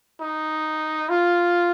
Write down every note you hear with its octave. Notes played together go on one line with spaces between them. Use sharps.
D#4
F4